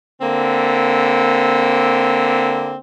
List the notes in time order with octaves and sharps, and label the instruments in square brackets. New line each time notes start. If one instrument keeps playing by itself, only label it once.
[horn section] D3 A#3 C4